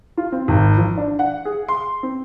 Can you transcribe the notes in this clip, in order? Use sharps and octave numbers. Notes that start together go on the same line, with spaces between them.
F4
C4
G#1
F3
D4
F#5
G#4
C6
C4